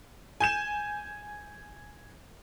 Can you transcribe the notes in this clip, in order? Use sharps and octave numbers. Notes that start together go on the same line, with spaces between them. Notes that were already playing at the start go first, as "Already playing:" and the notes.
G#5 G6 E7